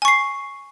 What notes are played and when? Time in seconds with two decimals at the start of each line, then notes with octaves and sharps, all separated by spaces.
0.02 G#5
0.05 C#6
0.08 C7